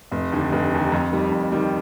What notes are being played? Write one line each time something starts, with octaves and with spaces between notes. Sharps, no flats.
F1
D#2 D3
F1
D#2 D3
F2
D#3 G3
F2
D#3 G3